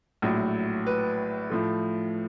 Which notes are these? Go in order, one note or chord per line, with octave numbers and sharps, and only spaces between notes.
A#1 A2 F#3
B4
A2 F3 A3